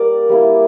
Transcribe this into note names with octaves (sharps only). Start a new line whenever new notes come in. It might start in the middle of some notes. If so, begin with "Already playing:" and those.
Already playing: G3 A#3 A#4 D5
G3 A#3 E4